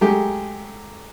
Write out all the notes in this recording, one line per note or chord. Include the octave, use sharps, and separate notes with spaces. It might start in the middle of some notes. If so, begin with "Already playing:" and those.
F#3 G#3 A3 G4